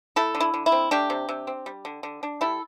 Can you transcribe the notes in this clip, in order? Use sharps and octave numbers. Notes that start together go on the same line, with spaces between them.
A3 E4 A4
D3
E4
D3
E4
C4
A3 D4 G4
C3
C3
C4
G3
D3
D3
D4
G3 E4 A4